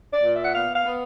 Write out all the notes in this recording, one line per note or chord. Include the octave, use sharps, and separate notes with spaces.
D5
A#2
E5
F#5
B3 F5
F5
B3